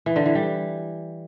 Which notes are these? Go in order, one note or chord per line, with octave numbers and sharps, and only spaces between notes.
E3
D3
E3
G3